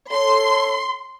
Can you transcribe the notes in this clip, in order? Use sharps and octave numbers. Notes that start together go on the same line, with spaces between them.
A4 C#5 C6